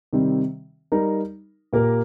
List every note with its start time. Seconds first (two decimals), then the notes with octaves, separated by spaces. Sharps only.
0.13 C3 D#3 G3 C4
0.92 G3 D#4 A#4
1.73 A#2 A#3 G4 A#4